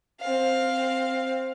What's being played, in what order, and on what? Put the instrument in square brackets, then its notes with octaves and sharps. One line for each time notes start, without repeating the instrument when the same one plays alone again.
[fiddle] C4 F5